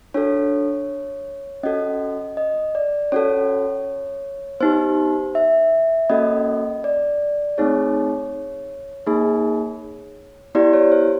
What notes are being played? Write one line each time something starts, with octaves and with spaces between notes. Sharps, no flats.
D4 F#4 A4 C#5
C#4 F#4 A4 D#5
D#5
D5
C#4 F#4 A4 C#5
B3 D#4 G4 C5
E5
A#3 C#4 F#4 A4 D#5
D5
A3 C4 D#4 G#4 C#5
A#3 D#4 G#4
B3 E4 G4 D5
C#5
C5